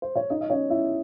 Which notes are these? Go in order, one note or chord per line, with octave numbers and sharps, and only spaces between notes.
C5
C#5
D#4 D#5
D#5
C#4 C#5
E4 E5